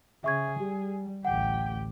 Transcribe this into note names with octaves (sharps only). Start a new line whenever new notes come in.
C#3 G#4 E5 C#6 G#6
G3 G4
A1 D2 G4 F#5 G5